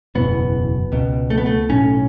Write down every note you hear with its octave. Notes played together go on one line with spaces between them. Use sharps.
F#1 E2 B2 B3
C#2 B2
A3
B3
A3
B1 A2 C#4